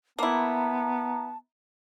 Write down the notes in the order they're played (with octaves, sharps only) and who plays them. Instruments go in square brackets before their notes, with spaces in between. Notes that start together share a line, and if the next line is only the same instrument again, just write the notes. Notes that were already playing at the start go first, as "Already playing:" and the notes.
[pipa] A#3 E4 [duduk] B3 [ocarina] A5 [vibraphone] A#5